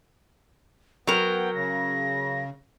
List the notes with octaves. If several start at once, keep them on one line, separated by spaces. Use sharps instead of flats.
F#3 B3 A#4 G5
C#3 A#6